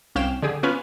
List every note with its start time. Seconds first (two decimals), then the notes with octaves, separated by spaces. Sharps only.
0.15 C2 C#4 F5 G5 E7
0.42 D3 G4 G#4
0.63 B3 C#4 F4 B4 C#5 G#5